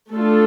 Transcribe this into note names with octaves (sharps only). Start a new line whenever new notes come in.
A3 D4 F4 A4